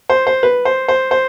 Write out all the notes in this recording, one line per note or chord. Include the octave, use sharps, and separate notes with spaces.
C5
C5
B4
C5
C5
C5